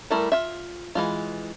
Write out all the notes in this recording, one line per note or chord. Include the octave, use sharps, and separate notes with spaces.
G3 A3 E4 A#4
F4 E5
E3 G#3 F4